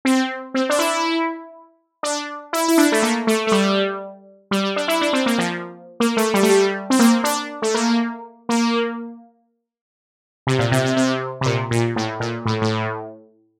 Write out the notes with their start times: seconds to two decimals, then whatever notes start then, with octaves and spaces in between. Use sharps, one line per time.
0.05 C4
0.54 C4
0.69 D4
0.79 E4
2.03 D4
2.53 E4
2.68 E4
2.78 D4
2.92 A3
3.03 A#3
3.27 A3
3.47 A3
3.52 G3
4.51 G3
4.63 G3
4.76 D4
4.88 E4
5.01 D4
5.13 C4
5.26 A#3
5.38 F3
6.00 A#3
6.17 A3
6.34 G3
6.43 A3
6.49 G3
6.90 C4
6.99 A#3
7.24 D4
7.62 A3
7.74 A#3
8.49 A#3
10.47 C3
10.59 A#2
10.72 C3
10.85 C3
10.97 C3
11.41 C3
11.46 A#2
11.71 A#2
11.96 A2
12.20 A#2
12.46 A2
12.62 A2